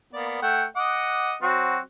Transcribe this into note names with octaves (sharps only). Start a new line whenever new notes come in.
A#3 B3 D5
A3 F#5 G5
D#5 F#5 D6
F#3 C4 F#4